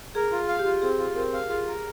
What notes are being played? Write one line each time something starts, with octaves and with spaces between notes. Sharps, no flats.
G#4 A#4
F4
G#4
F5
G4
F4
C4 G#4
F4
C4 A#4
F5
F4 G#4
A#4